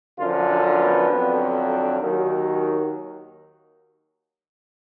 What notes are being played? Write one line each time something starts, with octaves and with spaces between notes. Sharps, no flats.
F#2 D3 F3 F4
D4
B3
F2 D3 F#3
D#2 D#3 F#3